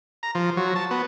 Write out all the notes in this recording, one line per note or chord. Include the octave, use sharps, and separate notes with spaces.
A#5
F3
F#3
A5
B3